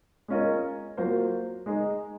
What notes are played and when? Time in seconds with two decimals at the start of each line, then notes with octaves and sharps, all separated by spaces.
0.28 G#3 C#4 F4 A#4 D#5
0.97 F#3 A#3 F4 C5
1.66 G#3 D#4 G#4